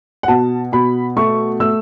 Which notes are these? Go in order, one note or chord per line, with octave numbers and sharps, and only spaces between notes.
F#5
B2 A5
B2 B5
A3 C#6
A3 E6